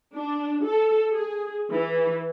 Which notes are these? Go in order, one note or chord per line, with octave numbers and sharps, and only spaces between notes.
D4
A4
G#4
E3